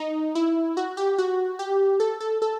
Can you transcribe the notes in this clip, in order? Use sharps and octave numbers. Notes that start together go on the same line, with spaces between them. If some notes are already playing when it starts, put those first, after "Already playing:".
Already playing: D#4
E4
F#4
G4
F#4
G4
A4
A4
A4